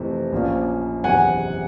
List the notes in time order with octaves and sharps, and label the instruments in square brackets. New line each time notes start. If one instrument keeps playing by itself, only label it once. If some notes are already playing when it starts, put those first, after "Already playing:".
Already playing: [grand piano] F2 C3 E3 A3 C4
A#1 A#2 F3 A#3 C#4
[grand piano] F#1 E2 C3 D#3 [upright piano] F#5 G#5